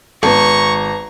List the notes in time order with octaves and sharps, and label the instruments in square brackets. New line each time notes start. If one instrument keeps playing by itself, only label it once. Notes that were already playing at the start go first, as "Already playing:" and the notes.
[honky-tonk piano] G#1 B3 [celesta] B4 A5 [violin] A#5 [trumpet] C#6